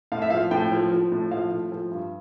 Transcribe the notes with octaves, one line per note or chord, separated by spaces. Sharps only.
A2 F5
E5
F3 F5
A2 G5
F3
F3
A2
F3 F5
A2
F3
G2